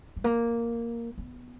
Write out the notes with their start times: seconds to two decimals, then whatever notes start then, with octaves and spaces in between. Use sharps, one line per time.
0.17 G3
0.24 A#3
1.18 B3